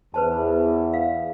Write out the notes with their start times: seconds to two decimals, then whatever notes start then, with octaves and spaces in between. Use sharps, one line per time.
0.14 E2 B4 C5 A5
0.94 F5